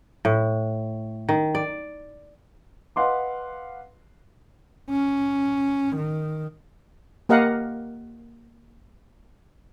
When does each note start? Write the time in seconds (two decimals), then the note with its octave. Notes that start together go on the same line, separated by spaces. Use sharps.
0.25 A2
1.29 D#3
1.55 D5
2.96 B4 D#5 F5 F#5 C6 D6
4.90 C#4
5.96 D#3
7.29 A#3 G4 A#4 D#5 F5 F#5